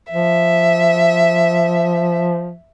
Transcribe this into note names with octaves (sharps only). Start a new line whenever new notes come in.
F3 E5